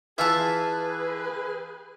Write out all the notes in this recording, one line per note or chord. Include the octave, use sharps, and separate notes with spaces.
E3 E4 F4 G#4 B4 E5 A5